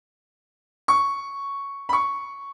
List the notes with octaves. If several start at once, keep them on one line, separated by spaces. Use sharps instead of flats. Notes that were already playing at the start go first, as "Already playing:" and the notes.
C#6
B5
C#6